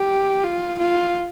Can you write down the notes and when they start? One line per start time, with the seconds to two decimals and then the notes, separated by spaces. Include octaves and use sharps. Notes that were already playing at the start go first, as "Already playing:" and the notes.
Already playing: G4
0.43 F4
0.78 F4